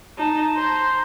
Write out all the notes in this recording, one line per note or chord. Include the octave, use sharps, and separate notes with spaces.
D#4 A5
C5 A#5